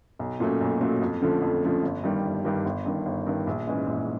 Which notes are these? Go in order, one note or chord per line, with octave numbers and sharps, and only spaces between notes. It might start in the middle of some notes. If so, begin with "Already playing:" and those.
B1
A#2 F#3 A3 C#4
B1
A#2 F#3 A3 C#4
F2
D3 F3 A3 C#4
F2
D3 F3 A3 C#4
G1
G2 D#3 G3
G1
G2 D#3 G3
G1
G2 D#3
G1
G2 D#3
A#1
G#2 E3 G#3 C#4
A#1